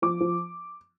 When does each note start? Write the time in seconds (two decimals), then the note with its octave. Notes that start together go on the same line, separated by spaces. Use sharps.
0.02 F3 D6
0.21 F3